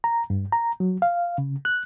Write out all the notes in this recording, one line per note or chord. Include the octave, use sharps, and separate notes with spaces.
A#5
G2
A#5
F#3
F5
C#3
F#6